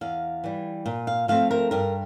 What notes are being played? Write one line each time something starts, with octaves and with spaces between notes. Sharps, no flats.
E2 F5
E3 G3
A#2
F5
F3 A3 C4 F5
A#4
G2 A#4